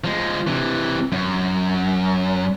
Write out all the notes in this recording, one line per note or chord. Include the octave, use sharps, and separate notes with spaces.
F3 G#3
C3 E3
F#2